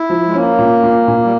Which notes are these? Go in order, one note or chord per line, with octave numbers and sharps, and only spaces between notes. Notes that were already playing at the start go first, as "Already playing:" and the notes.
Already playing: E4
F3
G#3
A#3 C#4
A#2
A#2
A#2
G3